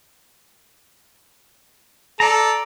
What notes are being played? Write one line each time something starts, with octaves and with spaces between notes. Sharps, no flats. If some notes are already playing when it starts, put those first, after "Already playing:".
A4 D5 A#5